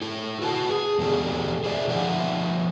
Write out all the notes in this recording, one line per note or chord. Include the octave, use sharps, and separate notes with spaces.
E4 A4
F#4 B4 F#5 A5
G#4
E2 B2 A3 D4 G4 A4
G#4 C5 D5 E5
B2 F3 C5 E5 F#5